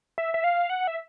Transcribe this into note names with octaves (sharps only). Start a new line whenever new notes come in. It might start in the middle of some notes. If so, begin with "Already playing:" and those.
E5
E5
F5
F#5
E5